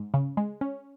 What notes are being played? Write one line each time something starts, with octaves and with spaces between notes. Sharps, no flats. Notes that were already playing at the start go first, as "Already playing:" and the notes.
Already playing: G#2
C#3
G#3
C#4